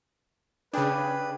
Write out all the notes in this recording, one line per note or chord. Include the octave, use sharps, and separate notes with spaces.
C#3 D4 G4 G#4 B4